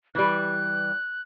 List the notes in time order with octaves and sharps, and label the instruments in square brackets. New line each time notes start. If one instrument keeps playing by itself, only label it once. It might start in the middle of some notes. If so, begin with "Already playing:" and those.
[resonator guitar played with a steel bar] E3 G3 [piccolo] F#6